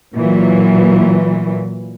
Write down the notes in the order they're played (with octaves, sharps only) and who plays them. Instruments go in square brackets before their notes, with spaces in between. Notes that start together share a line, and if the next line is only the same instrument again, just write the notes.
[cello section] A#2 E3 F#3